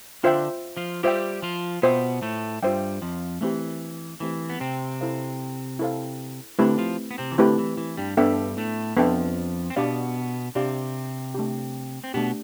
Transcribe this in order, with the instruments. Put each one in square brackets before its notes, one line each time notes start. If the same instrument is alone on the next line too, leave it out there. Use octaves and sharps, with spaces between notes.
[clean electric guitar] D3 D4 [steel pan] F4 C5 E5 G5
[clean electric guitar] F3 F4
[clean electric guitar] G3 G4 [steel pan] F4 C5 E5 G5
[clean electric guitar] F3 F4
[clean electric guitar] B2 B3 [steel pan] F4 C5 E5 G5
[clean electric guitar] A2 A3
[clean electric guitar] G2 G3 [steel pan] F4 C5 E5 G5
[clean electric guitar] F2 F3
[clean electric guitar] E3 [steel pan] A3 C4 G4
[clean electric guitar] E3 [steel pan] A3 C4 G4
[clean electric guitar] B3
C3 C4
[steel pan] E4 A4 C5 F5
E4 A4 C5 F5
[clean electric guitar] D3 D4 [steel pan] A3 C4 E4 G4 B4
[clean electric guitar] F3 F4
B3
C3 C4
E3
[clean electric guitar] D3 [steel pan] A3 C4 E4 G4 B4
[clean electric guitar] E3
E3
G2 G3
[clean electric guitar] G2 G3 [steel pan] B3 D4 A4 E5 G5
[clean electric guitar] A2 A3
[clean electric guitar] F2 F3 [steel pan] B3 D4 A4 E5 G5
[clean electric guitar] C4
[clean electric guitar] B2 B3 [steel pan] D4 G4 D5 F5
[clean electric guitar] C3 C4 [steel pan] D4 G4 D5 F5
[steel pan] A3 D4 G4
[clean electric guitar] C4
[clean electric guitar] B2 B3 [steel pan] A3 D4 G4